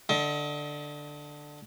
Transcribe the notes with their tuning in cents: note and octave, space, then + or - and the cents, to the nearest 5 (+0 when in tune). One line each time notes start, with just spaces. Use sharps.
D3 +5 D#5 +35